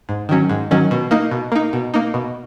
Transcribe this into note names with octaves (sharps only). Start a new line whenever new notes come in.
G#2
D#3 F#3 C#4
G#2
D#3 F#3 C#4
B2
A#3 D#4
B2
A#3 D#4
B2
A#3 D#4
B2